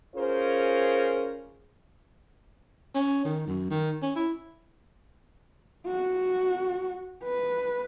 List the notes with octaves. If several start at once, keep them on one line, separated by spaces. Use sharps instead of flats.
C#4 F4 G#4 A#4 C5
C#4
D#3
F#2
D#3
C#4
E4
F#4
B4